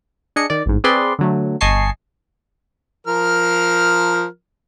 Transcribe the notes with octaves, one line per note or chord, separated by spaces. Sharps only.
D4 G#4 D#5 C#7
D#3 D5
A1 G#2
C4 G#4 B4 D5 C6
D3 F#3 A3
G1 D#5 G#5 A5 C#6 C7
F3 A#4 F6